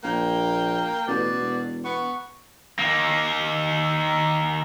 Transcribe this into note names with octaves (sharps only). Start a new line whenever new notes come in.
A#1 A#3 G5
A1 B2 D5
E1
B3 C#6
D#3 A#3